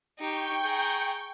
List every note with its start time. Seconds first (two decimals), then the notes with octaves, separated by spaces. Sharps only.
0.19 D#4 G4 G5 C#6 G6
0.63 G#4 A#5